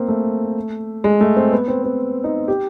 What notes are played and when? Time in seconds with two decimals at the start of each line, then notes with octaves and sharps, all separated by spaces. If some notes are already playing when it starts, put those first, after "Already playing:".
Already playing: A#3 C4
0.08 A3
1.04 G#3
1.21 A3
1.36 C4
1.52 B3
1.68 C4
1.84 C4
2.24 D#4
2.48 G4